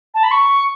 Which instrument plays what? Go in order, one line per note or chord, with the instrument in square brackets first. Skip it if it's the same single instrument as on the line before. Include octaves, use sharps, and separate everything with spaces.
[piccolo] A5
B5
C#6